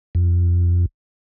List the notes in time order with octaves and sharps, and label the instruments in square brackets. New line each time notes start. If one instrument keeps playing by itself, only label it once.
[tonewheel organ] F2